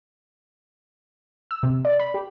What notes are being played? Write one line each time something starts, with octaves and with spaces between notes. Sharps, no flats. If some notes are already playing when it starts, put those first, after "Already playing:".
E6
C3
D5
B5
G4